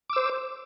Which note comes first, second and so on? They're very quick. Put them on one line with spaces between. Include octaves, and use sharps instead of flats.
D6 E6 C5